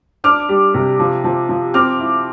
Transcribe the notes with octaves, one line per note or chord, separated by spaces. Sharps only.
D4 D6 F6
G3
C3
F3
F3
F3
C4 D6 F6
E4